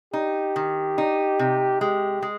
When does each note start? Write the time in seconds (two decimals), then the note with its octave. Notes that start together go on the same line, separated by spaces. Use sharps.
0.13 D#4 G4
0.56 D#3
0.98 D#4
1.39 C3
1.81 G#3 G4
2.22 G#3